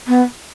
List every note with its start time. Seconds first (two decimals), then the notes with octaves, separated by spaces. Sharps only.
0.08 B3